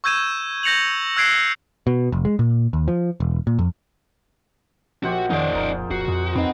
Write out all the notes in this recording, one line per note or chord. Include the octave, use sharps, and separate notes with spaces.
C#6 E6 G6 G#6 D#7 E7
G6 A#6 C#7 F7 F#7
E6 F#6 G#6 C7 D7
B2
F1
G#3
A#2
D#2
F3
E1
A#2
F2
A#1 F#4 G4 C5 F#5
F2 D#3 D#4 G#4 C5 D5 F5
D1 A#4
D1 F#4 C7
F2 G#3
F2 C4 D#4 B4 C#5 D#5 F#5